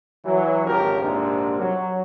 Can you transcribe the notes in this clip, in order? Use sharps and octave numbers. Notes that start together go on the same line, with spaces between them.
E3 F#3
G#1 C#2 F3 C#4 G4 A#4
A#1 G#2 C3 D4 A#4
F#3